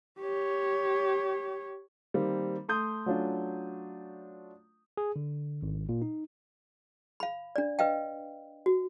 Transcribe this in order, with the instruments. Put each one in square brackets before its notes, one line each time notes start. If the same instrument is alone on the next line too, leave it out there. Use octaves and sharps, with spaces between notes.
[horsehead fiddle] G4 C#5
[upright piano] D#3 G3 A#3 C4
A3 C6 D#6 G6
F#3 A3 C#4 D4 F4
[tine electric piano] G#4
D3
G#1
A#2
D#4
[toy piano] F5 B5
D4 D5
B4 D#5 F5 G5
F#4